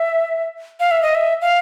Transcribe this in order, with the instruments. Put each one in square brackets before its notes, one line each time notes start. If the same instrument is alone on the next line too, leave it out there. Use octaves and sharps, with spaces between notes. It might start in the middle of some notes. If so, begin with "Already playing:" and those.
Already playing: [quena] E5
F5
E5
D#5
E5
F5